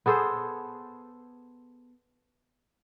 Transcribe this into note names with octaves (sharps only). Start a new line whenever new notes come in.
B3 G#4 A4 C5